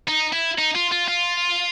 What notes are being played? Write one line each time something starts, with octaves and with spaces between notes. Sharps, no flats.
D#4
E4
D#4
F4
F4
F4